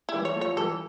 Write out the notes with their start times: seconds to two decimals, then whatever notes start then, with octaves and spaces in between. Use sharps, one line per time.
0.09 E4
0.14 E3 G3
0.25 C#5
0.36 F3 A3
0.41 C#5
0.53 F3
0.57 E3 G3 A4